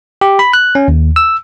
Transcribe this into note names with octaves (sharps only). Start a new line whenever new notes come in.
G4
B5
F#6
C#4
D#2
E6